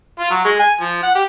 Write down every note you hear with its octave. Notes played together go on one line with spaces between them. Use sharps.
F4
F#3
G#3
G#5
F3
F#5
G4